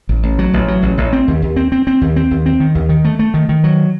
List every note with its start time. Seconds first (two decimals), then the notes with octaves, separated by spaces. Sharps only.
0.09 A1
0.23 A1
0.39 F#3
0.54 A1
0.68 F#3
0.82 A1
0.98 A1
1.13 C4
1.28 D#2
1.42 D#2
1.56 C4
1.72 C4
1.87 C4
2.01 D#2
2.16 C4
2.31 D#2
2.46 C4
2.60 D#3
2.75 D#2
2.89 D#3
3.05 A3
3.19 A3
3.34 D#3
3.49 D#3
3.64 F#3